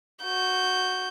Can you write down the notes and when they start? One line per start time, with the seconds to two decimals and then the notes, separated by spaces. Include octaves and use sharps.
0.24 F#4 G6